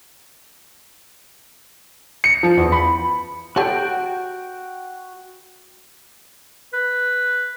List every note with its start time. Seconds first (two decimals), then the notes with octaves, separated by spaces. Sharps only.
2.24 C#7
2.43 F3
2.57 E2
2.72 B5
3.56 F#4 G4 A4 C#5 G5
6.73 B4